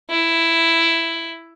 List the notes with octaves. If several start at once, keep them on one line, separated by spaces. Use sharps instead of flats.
E4